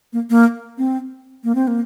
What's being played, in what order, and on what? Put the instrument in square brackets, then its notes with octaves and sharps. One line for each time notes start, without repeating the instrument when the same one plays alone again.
[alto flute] A#3
A#3
C4
A#3
C4
A#3